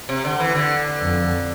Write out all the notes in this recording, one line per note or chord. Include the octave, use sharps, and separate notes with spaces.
C3
D3
E3
D3
F2